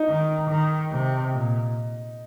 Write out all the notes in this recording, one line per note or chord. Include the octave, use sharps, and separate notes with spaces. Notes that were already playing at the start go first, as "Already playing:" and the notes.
Already playing: D#4
D#3
D#3
C3
A#2